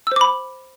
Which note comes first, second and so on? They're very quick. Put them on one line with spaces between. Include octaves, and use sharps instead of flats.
E6 C5 D6 B5